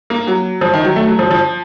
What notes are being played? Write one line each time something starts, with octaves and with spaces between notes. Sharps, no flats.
A#3
F#3
F3
D#3
F#3
A3
F#3
F3
F3